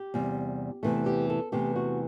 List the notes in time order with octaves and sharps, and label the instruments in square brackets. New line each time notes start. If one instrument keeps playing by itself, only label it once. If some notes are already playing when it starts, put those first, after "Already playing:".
Already playing: [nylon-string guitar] G4
E2 C3 G3
E2 C3 E3 A3
G4
A4
E2 C3 E3 A3 G4
F#4